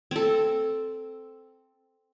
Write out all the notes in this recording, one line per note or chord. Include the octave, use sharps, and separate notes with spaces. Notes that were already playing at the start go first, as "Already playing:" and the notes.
C4 A4